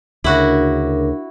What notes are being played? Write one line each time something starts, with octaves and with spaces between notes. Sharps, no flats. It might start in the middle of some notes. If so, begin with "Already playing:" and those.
D2 C#3 D4 E4 F#4 A#4